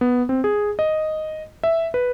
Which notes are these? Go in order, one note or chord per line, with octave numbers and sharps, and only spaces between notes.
B3
C4
G#4
D#5
E5
B4